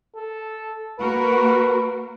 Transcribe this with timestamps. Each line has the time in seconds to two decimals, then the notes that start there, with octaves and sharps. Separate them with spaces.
0.16 A4
1.00 A#3 F#4 A#4 B4